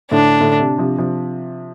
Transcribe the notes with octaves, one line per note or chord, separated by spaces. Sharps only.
A2 D3 D4
A2 D3
C3
C3 F3
C3 F3